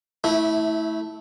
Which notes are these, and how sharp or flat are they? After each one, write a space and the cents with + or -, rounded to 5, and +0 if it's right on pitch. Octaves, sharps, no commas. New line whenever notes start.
A3 +0 E4 -25